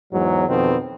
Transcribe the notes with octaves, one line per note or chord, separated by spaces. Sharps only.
E2 G#2 F#3
F2 B2 D#3 B3 C4